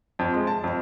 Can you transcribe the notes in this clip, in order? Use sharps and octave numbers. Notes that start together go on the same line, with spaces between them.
F2
G#3
A5
F2